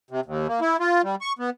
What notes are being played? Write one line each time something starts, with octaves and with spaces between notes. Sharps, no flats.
C3
D#2
A#3
E4
F4
G3
C#6
B3